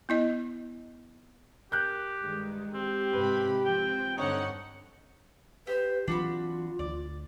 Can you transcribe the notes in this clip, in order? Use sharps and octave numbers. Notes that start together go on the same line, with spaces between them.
B3 E4 D#5
G4 A#4 F#6 G6
G2 D#3 G#3
C4 G4
G#2 C3 B4 B5
F3 C4 G5
G2 D3 C4 D#4 C#5 F#5 C#6
G4 B4 C5
E3 F#3 C4 D4 F4 F#4 B5
D2 D5